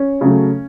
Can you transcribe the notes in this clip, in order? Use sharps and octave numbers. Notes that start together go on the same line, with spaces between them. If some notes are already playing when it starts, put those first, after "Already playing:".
Already playing: C#4
C#3 F#3 A3